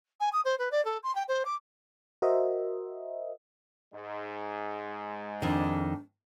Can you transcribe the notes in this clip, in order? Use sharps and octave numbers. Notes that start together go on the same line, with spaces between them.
G#5
D#6
C5
B4
D5
A4
C6
G5
C5
D6
F#4 A#4 C5 D#5 E5
G#2 G#3
F2 D#3 D4